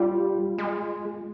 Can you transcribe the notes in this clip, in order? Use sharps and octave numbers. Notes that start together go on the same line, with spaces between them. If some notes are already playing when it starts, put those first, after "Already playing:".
Already playing: G3 F4
G#3